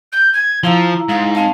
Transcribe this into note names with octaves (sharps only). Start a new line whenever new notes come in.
G6
G#6
F3 E4 F5 A#5 E6
G#2 F5
C4 F5 A5